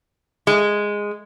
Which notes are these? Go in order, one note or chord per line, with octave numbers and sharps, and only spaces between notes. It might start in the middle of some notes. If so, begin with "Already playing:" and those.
G#3